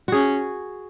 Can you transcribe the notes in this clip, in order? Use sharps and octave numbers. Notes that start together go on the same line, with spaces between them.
C#4 F#4 G#4